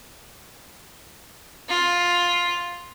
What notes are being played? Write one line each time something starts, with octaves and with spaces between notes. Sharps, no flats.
F4